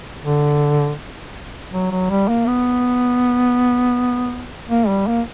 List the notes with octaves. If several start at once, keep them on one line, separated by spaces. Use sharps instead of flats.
D3
F#3
F#3
G3
A#3
B3
A#3
G3
A#3